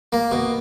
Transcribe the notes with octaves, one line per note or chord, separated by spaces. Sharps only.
A#3
B2